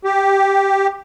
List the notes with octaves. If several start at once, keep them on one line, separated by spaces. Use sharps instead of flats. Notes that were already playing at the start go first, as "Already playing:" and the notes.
G4